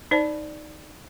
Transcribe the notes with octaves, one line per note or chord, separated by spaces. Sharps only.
D#4 C5 D5 A5